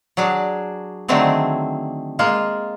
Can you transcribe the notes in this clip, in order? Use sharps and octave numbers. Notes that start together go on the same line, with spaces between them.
F#3 D4 G#4 D5
D3 D#3 F#3 A3 C4 G#4
G#3 A#3 F4